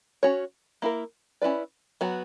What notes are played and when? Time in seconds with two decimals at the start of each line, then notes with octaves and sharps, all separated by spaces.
0.23 C#4 F#4 C#5
0.82 A#3 E4 A#4
1.42 C#4 E4 B4 D5
2.01 F#3 B3 F#4